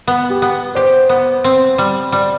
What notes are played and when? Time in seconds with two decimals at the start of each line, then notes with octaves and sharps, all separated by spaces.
0.07 B3
0.30 G4
0.42 B3
0.75 G4 C5
1.09 B3
1.44 C4
1.78 G3
2.12 G3 D5